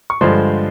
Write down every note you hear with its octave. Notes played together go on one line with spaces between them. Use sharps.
C#6
G2 D3 F3 G#3 C5 C6